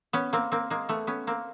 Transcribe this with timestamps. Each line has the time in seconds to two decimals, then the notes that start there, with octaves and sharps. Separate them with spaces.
0.13 B3 C#4
0.33 A#3 C4
0.52 A#3 C4
0.70 G#3 A#3
0.89 A3 B3
1.07 B3 C#4
1.27 A#3 C4